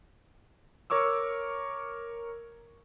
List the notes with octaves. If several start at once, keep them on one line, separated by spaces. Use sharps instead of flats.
A#4 C#5 C#6 D6 E6